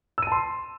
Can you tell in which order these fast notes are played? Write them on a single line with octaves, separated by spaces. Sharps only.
E6 D#7 A5 C6